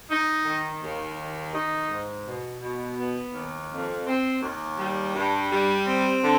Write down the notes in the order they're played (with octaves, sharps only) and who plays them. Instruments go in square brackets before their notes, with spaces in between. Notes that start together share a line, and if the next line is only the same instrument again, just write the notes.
[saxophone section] D#4
D#3
D#2
D#3
D#4
G#2
B2
B2
B3
D#2
F2
C4
D#2
G3
G2
G3
C4
D3